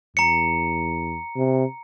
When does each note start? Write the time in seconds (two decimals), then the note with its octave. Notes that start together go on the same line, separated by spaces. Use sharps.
0.17 E2 A#5 C#7
1.37 C3